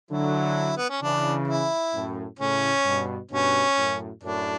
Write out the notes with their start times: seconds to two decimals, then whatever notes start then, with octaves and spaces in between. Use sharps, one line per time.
0.11 D3 F#3 E4
0.77 B3
0.90 C#4
1.02 C#3 E3 D4
1.48 E4
1.93 F#2 A2
2.39 A2 C#3 C#4
2.86 G2 B2
3.31 G2 B2 C#4
3.77 F#2 A2
4.23 F#2 A2 D4